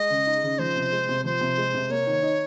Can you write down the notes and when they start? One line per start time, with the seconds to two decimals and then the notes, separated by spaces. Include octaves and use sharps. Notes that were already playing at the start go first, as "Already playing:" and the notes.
Already playing: G#3 D#5
0.10 C#3
0.26 D#4
0.43 C#3
0.58 F3 C5
0.76 C3
0.92 G#3
1.09 C3
1.24 F3 C5
1.41 C3
1.58 G#3
1.74 C3
1.90 A#3 C#5
2.07 D#3
2.22 D#4